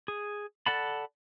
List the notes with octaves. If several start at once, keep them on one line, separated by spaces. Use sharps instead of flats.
G#4
A4 D5 F#5 A5 B5